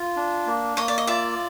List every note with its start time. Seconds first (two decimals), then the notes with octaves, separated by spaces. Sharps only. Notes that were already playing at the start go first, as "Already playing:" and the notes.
Already playing: F4
0.16 D4
0.47 A#3
0.77 A#3 C#5 D#5
0.88 D5
0.98 D#5
1.07 F4 D5 E5